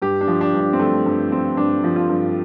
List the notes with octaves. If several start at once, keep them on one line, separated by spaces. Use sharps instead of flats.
G2 G4
D4
F3
D4
G2
D4
C4
F3 A3
G2
F3 C4
G2 D4
F3
F4
G2